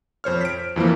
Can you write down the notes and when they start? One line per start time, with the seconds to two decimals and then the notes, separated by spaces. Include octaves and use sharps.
0.24 F2 C5 C#5 F6
0.41 B6 D7
0.76 F2 E3 F3 A#3